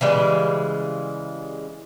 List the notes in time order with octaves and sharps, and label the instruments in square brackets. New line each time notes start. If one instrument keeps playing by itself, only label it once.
[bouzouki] C#3 E3 G3 G#3